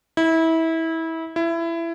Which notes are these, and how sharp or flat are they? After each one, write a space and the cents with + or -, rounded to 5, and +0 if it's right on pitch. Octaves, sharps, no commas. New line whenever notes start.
E4 -25
E4 +20